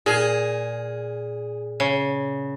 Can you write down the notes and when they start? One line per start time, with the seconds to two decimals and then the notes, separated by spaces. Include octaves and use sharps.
0.06 A#2 G#4
1.80 C#3